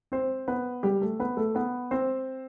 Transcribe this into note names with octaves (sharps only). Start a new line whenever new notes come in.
C4 C5
B3 B4
G3 G4
A3 A4
B3 B4
A3 A4
B3 B4
C4 C5